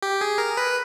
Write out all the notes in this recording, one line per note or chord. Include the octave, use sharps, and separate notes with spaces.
G4
G#4
A#4
B4